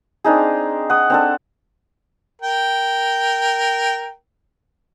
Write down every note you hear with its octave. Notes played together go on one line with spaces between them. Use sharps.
C4 D4 D#4 G#4
F#5 D#6
C4 D4 A4
A#4 G5